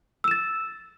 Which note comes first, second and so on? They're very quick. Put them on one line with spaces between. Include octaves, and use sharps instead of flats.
E6 E7 A6